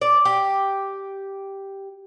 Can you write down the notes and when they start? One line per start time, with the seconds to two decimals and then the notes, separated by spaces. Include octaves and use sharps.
0.01 D5
0.25 G4